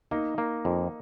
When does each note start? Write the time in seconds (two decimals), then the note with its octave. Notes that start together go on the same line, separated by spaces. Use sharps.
0.11 A#3 D#4
0.38 A#3
0.65 F2